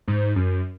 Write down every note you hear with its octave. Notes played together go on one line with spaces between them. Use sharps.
G#2
F#2